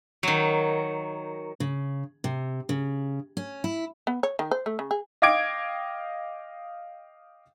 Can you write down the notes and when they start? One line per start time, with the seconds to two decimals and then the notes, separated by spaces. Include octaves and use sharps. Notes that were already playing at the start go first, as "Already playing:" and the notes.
0.23 D#3 F#3
1.60 C#3
2.24 C3
2.69 C#3
3.37 C#4
3.64 E4
4.07 B3
4.23 C#5
4.39 D#3
4.51 C5
4.66 A3
4.79 C#3
4.91 G#4
5.22 D#5 F5 G5 D6 G#6 D7